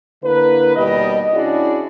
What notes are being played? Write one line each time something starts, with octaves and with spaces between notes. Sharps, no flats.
D3 A#3 E4 B4
D#2 B2 G3 D#5
C#4 D4 E4 F#4 G#4 D5